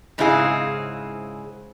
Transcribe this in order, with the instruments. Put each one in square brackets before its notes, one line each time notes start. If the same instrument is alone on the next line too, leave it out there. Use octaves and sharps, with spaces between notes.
[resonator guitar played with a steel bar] G#2 C#3 C4 E4 G#4 F5